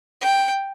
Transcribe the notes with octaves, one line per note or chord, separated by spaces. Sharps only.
G5